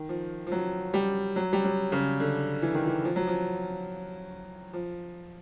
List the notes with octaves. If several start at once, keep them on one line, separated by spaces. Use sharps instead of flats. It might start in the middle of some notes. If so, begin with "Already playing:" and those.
Already playing: D#3
F3
F3
F#3
G3
F#3
G3
F#3
C#3
D3
E3
D#3
E3
F3
F#3
F3
F3